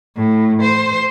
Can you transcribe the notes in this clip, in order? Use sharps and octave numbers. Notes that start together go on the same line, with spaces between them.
A2
C5